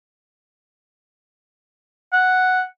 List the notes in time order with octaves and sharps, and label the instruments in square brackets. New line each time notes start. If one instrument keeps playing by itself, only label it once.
[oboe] F#5